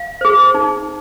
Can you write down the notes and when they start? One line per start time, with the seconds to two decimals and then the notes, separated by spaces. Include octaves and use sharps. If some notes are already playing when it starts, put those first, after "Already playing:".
Already playing: F5
0.21 G#4 C5
0.54 D#4